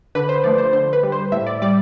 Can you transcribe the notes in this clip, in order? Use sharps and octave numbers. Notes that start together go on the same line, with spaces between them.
D3 B4
C5
F3 A3 D5
C5
D3 C5
B4
G3
C5
A2 E5
D5
G3 D5